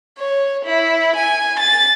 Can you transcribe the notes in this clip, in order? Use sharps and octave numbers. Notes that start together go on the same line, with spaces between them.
C#5
E4
G#5
A6